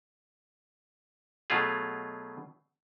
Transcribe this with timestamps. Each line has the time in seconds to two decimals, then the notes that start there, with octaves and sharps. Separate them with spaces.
1.50 B2 F#3 A3 F4 G#4